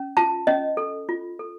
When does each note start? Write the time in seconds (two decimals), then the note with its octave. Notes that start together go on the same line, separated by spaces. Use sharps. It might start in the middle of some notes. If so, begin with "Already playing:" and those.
Already playing: C#4
0.17 F4 A5
0.47 C#4 D#5
0.77 A4
1.09 F4
1.39 A4